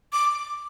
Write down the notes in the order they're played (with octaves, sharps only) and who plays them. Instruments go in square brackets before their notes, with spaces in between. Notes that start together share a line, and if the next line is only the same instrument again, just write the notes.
[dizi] D6